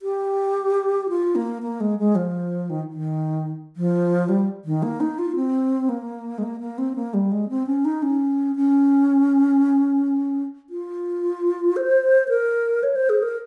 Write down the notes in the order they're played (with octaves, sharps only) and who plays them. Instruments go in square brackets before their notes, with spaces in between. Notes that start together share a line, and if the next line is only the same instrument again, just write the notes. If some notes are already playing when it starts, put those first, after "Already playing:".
[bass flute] G4
F4
A#3
A#3
G#3
G#3
F3
D#3
D#3
F3
G3
D#3
A#3
D#4
F4
C4
A#3
G#3
A#3
A#3
C4
A#3
G3
G#3
C4
C#4
D#4
C#4
C#4
F4
C5
A#4
C#5
C5
G#4
A#4